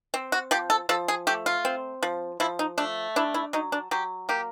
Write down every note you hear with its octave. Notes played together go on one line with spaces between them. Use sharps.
C4
F#4
F3 G4
A4
F3 A4
G#4
A3 G4
F4
C4
F3
F3 E4
D#4
A3 D4
D4 E4
E4
F#3 D#4
D4
F#3 G4
A#3 G4